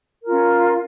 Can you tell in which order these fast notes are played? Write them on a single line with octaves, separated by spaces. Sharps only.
A#4 F4 C#4